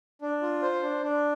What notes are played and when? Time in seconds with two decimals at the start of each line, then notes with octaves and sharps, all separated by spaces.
0.22 D4
0.42 F4
0.62 C5
0.83 D4
1.03 D4